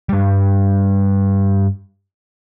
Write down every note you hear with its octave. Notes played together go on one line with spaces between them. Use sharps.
G2 G3